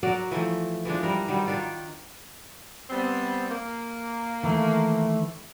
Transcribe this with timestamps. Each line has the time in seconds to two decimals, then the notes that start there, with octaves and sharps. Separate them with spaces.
0.03 F#3 F#4 A#4 D5
0.31 E3 F3 A3
0.85 E3 F3 G#3 D4
1.03 G3 A#4
1.28 D#3 F#3 G3
1.46 D#3 D4 F4
2.90 G3 B3 C4
3.49 A#3
4.43 D#3 E3 A3